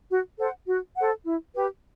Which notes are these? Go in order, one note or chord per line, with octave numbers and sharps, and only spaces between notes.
F#4
A4 C5 F#5
F#4
A4 C5 F#5
E4
G4 B4